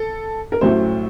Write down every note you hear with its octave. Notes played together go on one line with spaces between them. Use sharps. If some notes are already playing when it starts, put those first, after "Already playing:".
Already playing: A4
A#4
A1 A2 F#3 A3 C5